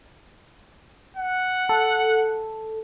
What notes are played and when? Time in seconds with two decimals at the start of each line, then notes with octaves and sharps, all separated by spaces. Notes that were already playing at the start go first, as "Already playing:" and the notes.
1.17 F#5
1.69 A4